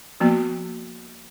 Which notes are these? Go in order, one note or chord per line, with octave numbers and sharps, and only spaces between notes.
F3 A#3 B3 F#4